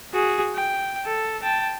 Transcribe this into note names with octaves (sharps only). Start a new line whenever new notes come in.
F#4 G#4
G5
A4
G5 A5